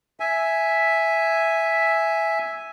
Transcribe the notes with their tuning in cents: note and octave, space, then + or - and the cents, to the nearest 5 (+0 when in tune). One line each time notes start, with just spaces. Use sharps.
E5 +0 G#5 +0